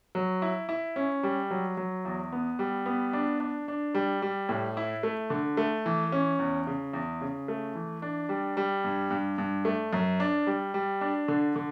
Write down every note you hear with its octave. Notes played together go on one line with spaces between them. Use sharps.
F#3
E4
E4
C#4
G3
F#3
F#3
E2
B3
G3
B3
D4
D4
D4
G3
G3
A2
E4
A3
D3
A3
E3
C#4
E2
C#3
E2
C#3
A3
E3
D4
G3
G3
G2
G2
G2
A3
F#2
D4
G3
G3
D4
D3
D3